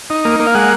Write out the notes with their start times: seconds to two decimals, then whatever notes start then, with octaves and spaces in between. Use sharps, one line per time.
0.10 D#4
0.25 A#3
0.40 A#3
0.47 F5
0.54 G#3 F#5